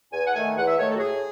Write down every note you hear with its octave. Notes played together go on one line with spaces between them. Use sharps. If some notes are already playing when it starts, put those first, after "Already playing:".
E2 G#5
F#5
D#3 A3 G#5
E2 F#5
E5
D#3 A3 C#5
A4
F#4
A2 G#4